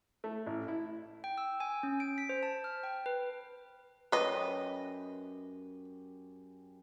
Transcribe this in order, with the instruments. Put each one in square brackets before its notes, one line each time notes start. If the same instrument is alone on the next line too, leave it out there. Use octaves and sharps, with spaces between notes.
[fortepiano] A3
A1
E4
[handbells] G5
E6
G#5
C#4
D7
B6
C5
A5
F6
G5
B4
[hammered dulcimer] F#2 G4 [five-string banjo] B4 D#5